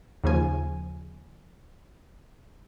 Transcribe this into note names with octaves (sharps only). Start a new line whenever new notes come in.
D#2 C#3 F3 G#5